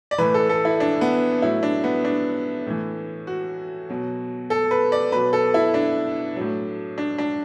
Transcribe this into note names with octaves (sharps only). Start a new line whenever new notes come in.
D5
A2 E3 B4
A4
A4
E4
D4
B3
A2 F#3 E4
D4
B3
D4
A2 E3
F#4
B2 F#3
A4
B4
D5
B2 F#3 B4
A4
E4
D4
A2 F#3
D4
D4